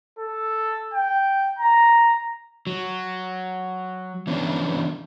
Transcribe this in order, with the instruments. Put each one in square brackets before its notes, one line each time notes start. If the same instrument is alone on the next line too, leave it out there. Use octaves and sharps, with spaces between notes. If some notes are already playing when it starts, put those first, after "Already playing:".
[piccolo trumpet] A4
G5
A#5
[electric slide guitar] F#3
E3 B3 C#4 D4